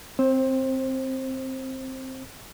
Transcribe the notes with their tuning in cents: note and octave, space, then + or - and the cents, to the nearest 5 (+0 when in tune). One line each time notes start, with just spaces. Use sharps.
C4 +0 C5 +20